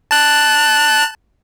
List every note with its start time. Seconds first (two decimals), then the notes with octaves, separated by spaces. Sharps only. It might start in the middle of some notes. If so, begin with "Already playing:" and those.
0.11 A5 F#6